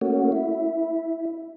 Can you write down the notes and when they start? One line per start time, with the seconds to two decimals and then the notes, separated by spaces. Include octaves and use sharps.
0.01 A3 A#3 C#4 F#4
0.32 E4